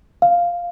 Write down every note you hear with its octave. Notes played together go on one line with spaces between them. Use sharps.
F5